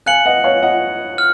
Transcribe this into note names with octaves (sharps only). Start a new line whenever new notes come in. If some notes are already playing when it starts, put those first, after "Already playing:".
F5 G#5 F#6 C#7 F#7
D#5 F#5
C#5 F5
D#5 F#5
F6